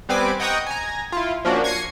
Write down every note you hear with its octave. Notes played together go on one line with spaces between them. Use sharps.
G3 B3 C4 B4 G#5 D6
D#5 F#5 G5 A#5 C#6 D#6
G#5 A#5
E4 F4
F3 A#3 C#4 D4 F#4
C#6 G#6 A#6 C7 C#7 D#7